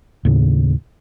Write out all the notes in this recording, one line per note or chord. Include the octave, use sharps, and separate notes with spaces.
D#2 A2 C#3